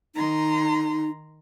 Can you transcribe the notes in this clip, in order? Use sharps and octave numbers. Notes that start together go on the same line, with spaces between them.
D#3 D#4 A#5 C6